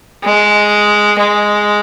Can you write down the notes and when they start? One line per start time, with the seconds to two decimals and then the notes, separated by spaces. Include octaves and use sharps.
0.24 G#3
1.19 G#3